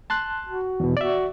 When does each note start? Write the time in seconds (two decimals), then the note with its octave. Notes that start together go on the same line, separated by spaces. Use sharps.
0.10 A5 C6 F#6
0.46 F#4
0.80 E2 B2
0.97 F#4 D5 E5